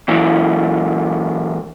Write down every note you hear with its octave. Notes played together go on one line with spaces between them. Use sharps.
A#2 E3 F#3